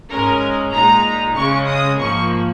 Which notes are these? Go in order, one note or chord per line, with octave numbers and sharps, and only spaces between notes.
G#2 G#3 C#4 A#4
A#2 G#3 D#4 A#5
C#3 G#3 C#4 C#6
D#6
G#2 F3 A#3 C#6